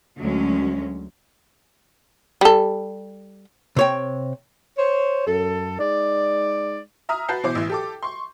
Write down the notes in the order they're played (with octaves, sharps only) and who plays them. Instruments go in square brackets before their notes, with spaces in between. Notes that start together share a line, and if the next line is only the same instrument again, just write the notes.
[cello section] D2 F#3 G#3 C#4
[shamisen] G3 A4
[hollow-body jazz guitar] C3 C#5 G5
[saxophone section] C5 C#5
F#2 A4
G#3 D#4 D5
[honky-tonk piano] E5 A#5 D#6 F6
F#4 B4 A5 G6 C7
B2 E3 C5 D6
A1 E3
G4 A4 D6
C6 C#6